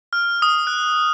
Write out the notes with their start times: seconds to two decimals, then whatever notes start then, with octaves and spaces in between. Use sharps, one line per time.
0.13 F6
0.42 D#6
0.67 F#6